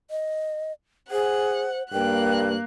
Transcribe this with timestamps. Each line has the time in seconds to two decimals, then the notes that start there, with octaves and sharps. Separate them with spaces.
0.10 D#5
1.11 G#4 C5 F#5
1.93 G2 A#3 A#4 G5 F#6